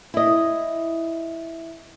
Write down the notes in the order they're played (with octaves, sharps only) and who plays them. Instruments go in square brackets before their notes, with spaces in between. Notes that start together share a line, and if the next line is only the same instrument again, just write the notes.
[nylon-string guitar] E4 D#5